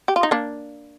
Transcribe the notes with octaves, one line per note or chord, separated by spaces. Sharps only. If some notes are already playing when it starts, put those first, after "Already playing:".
G4
F4
D#4
A#3 D4